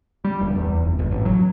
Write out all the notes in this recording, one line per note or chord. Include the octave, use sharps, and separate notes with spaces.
G3
D1
E2
F1
G1
A1
F#3